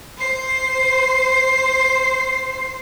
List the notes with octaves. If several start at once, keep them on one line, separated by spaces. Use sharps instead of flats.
C5 C7